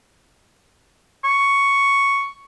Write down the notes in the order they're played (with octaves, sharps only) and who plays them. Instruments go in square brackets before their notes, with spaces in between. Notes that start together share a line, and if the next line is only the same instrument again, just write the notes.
[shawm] C#6